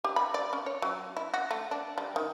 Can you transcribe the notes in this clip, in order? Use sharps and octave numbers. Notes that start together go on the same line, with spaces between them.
G4
B5
D5
C#4
C#5
F#3
E4
F#4
A3
D4
G3
D#3